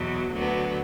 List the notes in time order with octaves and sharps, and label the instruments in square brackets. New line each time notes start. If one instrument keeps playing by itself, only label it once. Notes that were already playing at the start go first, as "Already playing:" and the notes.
Already playing: [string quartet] E2 B2 F#3
D2 D3 F#3 B3